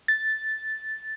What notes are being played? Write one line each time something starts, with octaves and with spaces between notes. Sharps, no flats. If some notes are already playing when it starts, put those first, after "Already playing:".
A6